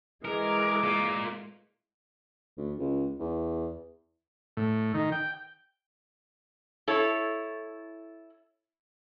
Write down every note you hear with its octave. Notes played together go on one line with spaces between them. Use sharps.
E3 G#3 G#4 A#4 D6
A#3 F4
D2
C#2
E2
A2
D#3
G5
E4 A4 C#5